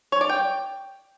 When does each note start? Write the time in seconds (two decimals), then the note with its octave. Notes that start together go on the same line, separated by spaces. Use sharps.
0.12 C#5
0.21 D5
0.29 G5